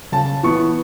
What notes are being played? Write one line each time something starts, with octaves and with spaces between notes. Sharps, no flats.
C#3 A5
E3 B3 C#6